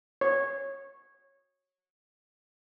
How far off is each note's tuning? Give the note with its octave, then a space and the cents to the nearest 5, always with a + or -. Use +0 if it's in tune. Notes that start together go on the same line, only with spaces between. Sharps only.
C#5 -15